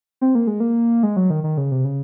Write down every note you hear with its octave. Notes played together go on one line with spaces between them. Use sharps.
C4
A#3
G#3
A#3
G#3
F#3
D#3
D#3
C#3
C3
C#3